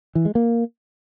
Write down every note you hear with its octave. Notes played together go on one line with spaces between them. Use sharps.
E3
G#3
A#3